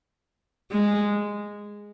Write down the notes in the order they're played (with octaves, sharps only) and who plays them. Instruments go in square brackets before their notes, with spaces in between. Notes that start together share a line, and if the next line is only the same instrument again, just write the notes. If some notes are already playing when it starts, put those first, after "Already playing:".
[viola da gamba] G#3